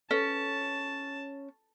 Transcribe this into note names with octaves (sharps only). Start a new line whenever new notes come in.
C#4 A4 B4 A5